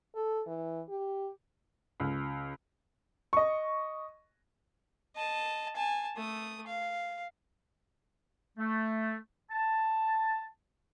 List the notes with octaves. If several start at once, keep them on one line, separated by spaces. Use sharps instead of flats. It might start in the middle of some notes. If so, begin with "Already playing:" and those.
A4
E3
G4
C#2
D#5 C#6
D#5 A5
G#5 A5
A3 D#6
F5
A3
A5